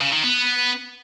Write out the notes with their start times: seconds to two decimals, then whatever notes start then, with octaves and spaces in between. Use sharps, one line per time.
0.01 C#3
0.12 D#3
0.23 B3